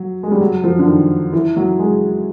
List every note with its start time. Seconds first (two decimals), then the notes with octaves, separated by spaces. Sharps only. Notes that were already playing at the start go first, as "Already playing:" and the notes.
Already playing: F#3
0.23 G#3
0.31 G3
0.41 F#3
0.64 F3
0.79 D3
0.86 D#3
1.33 E3
1.57 F#3
1.79 G#3